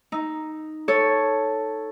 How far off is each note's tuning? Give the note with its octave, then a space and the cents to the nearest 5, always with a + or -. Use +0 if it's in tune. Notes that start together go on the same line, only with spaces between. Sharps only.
D#4 +0 E6 +0
A4 +0 C#5 +0